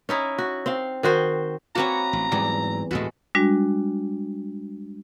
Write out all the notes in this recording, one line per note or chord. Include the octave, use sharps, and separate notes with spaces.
C#4 D#4 E4
F#4
C4 F5
D#3 F#4 C5
A#3 C4 F#4 B4 C#5 A#5
A1
E2 G#2 E3 F#3 G3
D2 A2 G#3 F#4 A4 B4
G3 G#3 D4 F#4